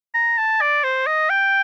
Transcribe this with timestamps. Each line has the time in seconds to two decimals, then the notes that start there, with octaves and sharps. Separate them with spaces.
0.14 A#5
0.38 A5
0.61 D5
0.83 C5
1.06 D#5
1.29 G5